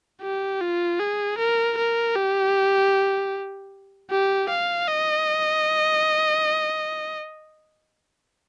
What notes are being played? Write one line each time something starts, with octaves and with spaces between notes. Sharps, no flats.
G4
F4
G#4
A#4
A#4
G4
G4
F5
D#5